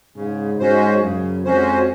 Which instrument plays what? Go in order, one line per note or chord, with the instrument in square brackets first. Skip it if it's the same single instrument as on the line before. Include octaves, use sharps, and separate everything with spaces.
[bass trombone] G#2 [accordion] C#3
[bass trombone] G#2 [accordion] G#3 C#4 F#4 C5
[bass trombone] F#2 [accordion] C#3
[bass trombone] F2 [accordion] G#3 C#4 F#4 C5